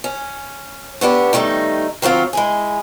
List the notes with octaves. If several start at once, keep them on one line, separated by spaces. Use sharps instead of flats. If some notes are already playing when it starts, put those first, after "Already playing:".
C#4
A3 B3 D4 G4
D#3 G3 A3 B3 D#4
D#3 F#3 C4 F4 F#4
G#3 E4 G#4